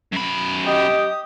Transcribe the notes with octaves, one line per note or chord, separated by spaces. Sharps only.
F#2 B5
G4 D#5 D#6